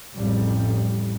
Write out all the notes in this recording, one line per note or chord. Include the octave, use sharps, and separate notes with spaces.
A1 F2 G3